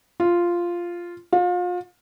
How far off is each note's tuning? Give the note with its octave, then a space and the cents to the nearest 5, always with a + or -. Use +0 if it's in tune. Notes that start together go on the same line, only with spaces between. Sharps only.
F4 -5
F4 +35